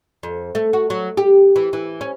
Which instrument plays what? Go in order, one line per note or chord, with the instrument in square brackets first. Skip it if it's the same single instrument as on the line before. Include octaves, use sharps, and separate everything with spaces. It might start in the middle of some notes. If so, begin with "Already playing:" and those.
[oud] F2
A3
F#4
F#3
G4
E3
E3
C#4